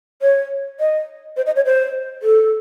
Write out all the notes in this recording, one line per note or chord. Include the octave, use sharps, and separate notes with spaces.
C#5
D#5
C5
D#5
C#5
C5
A4